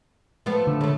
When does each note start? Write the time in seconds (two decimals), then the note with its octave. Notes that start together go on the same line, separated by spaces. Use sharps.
0.46 F3 A3 B3
0.67 D3
0.81 C#3 A3